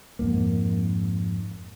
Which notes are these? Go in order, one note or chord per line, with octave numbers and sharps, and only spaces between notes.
F2 G#2 A#3